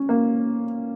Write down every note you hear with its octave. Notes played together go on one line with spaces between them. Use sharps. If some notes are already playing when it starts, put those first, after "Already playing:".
Already playing: C#4
A#3